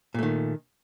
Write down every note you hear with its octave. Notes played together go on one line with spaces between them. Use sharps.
A#2 D#3 A3